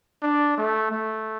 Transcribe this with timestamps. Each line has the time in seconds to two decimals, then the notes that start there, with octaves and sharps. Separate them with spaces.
0.22 D4
0.57 A3
0.91 A3